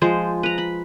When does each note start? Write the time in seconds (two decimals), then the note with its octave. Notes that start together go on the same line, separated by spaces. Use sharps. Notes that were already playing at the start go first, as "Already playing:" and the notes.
0.02 F3 G#3 C5
0.43 B4 A#5
0.58 B5